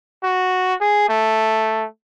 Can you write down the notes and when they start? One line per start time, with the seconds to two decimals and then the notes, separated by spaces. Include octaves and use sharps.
0.23 F#4
0.80 G#4
1.09 A3